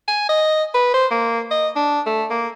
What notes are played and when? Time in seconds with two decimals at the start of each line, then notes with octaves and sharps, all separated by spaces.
0.08 G#5
0.29 D#5
0.74 B4
0.94 C5
1.11 A#3
1.51 D#5
1.76 D4
2.06 A3
2.30 A#3